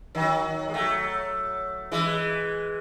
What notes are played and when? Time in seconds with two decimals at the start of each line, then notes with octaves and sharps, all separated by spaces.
0.15 D#3 F#3
0.68 G#3
0.74 F#3 A3
1.92 E3 G#3